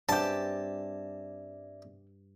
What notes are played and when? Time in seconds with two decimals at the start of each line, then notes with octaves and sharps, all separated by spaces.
0.09 G2 C#3 C4 G4 D5 E5 A5